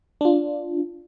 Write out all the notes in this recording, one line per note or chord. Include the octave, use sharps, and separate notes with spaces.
D4 F4